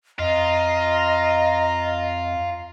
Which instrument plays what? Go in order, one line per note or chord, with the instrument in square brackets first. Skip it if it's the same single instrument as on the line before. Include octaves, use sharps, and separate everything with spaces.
[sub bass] F2 [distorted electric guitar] F4 [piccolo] D#5 [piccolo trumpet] A#5